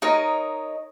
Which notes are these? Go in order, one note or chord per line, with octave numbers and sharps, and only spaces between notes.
D#4 A#4 C#5 D#5